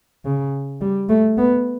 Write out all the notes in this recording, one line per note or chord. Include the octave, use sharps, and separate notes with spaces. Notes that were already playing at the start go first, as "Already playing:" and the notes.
C#3
G3
A3
B3